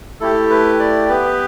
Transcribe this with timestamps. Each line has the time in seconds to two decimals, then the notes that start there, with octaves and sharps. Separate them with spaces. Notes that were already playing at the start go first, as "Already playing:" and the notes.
0.21 A3 E4 G4 A4
0.50 B4
0.79 D5
1.08 B3 G4 B4